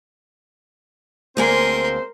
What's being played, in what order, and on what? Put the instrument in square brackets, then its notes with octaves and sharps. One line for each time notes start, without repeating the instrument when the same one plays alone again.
[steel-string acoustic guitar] D2 A#3 G#5 [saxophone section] G#3 C4 C5 [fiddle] A#4 C6